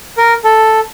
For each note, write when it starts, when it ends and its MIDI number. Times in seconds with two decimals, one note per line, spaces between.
0.18 0.34 70
0.44 0.80 69